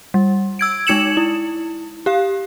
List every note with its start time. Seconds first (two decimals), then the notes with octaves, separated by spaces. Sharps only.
0.14 G3
0.59 E6 G#6 D7
0.87 G#3 D#4 G#6 C#7 E7 F#7
1.17 E4
2.06 G4 F5